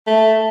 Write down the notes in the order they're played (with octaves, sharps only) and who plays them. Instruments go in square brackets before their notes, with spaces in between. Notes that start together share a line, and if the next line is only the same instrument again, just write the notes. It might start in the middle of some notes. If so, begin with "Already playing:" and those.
[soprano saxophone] A3